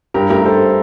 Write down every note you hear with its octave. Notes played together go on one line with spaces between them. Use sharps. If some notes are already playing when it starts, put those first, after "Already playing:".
G2 G4 A#4
A3 G4 A#4
G2 A4 C5